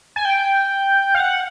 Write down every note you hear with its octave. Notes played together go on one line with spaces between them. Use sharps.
G#5
G5
F5
F#5